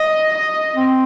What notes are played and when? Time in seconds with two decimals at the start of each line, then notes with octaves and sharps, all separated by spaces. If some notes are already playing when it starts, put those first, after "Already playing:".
Already playing: D#5
0.34 D#5
0.76 C4